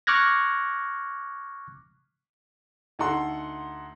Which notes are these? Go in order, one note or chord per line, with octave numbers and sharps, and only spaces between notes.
C#6 D6 F6 F#6 G#6 A#6
D2 D#4 A4 F#5 C6